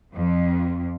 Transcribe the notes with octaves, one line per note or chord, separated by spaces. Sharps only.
F2